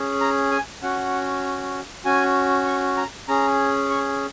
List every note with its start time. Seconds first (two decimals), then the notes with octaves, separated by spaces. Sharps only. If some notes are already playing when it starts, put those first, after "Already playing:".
Already playing: C#4 G#4
0.21 A#5
0.51 G#5
0.82 C#4 F#4 F#5
2.05 C#4 F#4 G#5
2.67 C#6
2.97 A#5
3.28 C#4 G#4 A#5
3.90 C#6